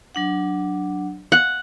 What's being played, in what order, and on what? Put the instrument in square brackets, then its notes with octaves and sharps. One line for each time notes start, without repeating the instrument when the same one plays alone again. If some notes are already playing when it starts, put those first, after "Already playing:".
[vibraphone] F#3 D4 F#5
[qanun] F#5